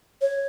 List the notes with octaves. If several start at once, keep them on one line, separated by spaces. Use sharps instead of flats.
C#5